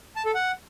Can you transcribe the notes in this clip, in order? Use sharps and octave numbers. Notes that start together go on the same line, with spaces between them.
A5
A4
F#5